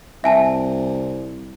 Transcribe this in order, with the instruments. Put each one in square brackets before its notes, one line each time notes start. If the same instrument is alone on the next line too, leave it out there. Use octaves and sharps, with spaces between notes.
[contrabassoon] C2 [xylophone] E5 G#5 A5